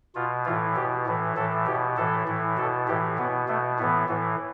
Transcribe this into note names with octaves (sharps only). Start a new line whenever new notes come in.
B2 F4
A2 E3 F4
B2 G4
A2 E3
A2 E3 A4
B2 G4
A2 E3 A4
A2 E3
B2 A4
A2 E3 G4
B2 B3
B2 A3
A2 E3 B3
A2 E3